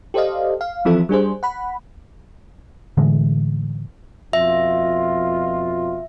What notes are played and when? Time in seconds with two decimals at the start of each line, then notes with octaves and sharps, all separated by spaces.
0.14 G4 A4 C5 D5 D#5 F5
0.61 F5
0.85 E3 F3 C4 F4 A4 E5
1.09 G3 D4 G#4 C5
1.43 F#5 B5
2.97 A2 D3 E3 G#3
4.33 F2 B2 F4 E5